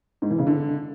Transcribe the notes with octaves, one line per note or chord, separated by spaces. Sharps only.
G#2
E3
C#3
D3